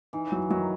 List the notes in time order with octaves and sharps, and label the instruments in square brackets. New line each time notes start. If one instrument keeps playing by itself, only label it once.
[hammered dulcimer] E3 [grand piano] D#4
[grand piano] F#3
[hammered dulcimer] D#3 [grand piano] F#3